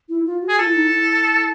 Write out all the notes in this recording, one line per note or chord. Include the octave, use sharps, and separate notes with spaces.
E4
F4
F#4
G#4
F4 A4
E4
D#4
E4